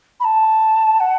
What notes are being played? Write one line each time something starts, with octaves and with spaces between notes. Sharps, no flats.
B5
A5
F#5